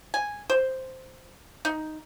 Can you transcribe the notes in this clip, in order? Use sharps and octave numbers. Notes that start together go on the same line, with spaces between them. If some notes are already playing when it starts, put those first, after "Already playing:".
G#5
C5
D#4